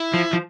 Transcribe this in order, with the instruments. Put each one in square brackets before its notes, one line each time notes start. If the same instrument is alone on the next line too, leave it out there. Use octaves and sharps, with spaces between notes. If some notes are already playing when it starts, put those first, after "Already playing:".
Already playing: [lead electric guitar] E4
[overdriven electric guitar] F3
F3